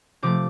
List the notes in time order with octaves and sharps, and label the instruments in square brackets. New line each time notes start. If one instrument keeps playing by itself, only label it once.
[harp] C3 F3 A3 D6